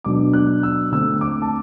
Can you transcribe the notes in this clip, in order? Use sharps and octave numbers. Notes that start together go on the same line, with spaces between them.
B2 F#3 B3 D4 D6
F#6
E6
D3 A3 C4 E6
D6
A5